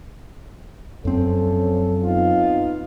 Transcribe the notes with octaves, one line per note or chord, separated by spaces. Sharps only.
F#2 F3 C4 C#4 A4
B3 D#4 F4